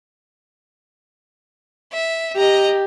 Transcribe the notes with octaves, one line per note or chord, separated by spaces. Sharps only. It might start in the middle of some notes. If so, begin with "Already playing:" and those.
E5
G4 D#5 A#5